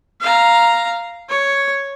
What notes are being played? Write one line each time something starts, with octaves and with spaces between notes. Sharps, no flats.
F5 A#5
C#5